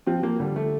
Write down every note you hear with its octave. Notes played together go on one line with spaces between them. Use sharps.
F3 C4
F3 A#3
D3 G3
A3